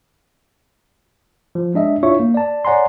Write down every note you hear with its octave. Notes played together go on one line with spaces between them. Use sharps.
F3
G#3 D4 D#5 E5
D4 E4 F4 C#5 E5 C#6
A#3
D5 A5
C#5 D5 F#5 G#5 A#5 C6